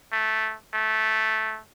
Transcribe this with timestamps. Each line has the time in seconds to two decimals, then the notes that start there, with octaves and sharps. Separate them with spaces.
0.12 A3
0.74 A3